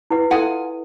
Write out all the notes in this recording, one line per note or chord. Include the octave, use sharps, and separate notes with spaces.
E4 B4 F#5
E4 F4 A4 E5 F#5 G#5